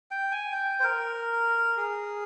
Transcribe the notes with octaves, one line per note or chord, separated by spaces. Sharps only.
G5
G#5
G5
C5
A#4
G#4